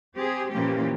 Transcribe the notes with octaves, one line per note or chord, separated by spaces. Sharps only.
C4 G4 G#4
A#2 E3 F3 A#3 C#4 G4